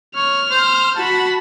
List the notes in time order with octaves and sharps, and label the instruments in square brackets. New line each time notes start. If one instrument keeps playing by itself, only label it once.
[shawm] C#5 [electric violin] F6
[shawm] C5
[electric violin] F#4 B5 [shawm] A5